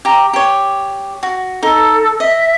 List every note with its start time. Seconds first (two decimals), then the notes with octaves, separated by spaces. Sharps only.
0.05 G4 A#5
0.33 G4 C#5
1.23 F#4
1.63 D#4 A4
2.20 D#5 E5